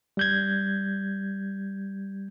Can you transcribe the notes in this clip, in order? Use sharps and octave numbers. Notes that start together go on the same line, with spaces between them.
G3 G6 G#6